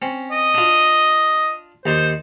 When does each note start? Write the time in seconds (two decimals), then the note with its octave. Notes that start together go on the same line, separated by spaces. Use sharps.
0.02 C4 C#4
0.31 D#5
0.54 D4 F4
1.86 D#2 D#4 C5 D5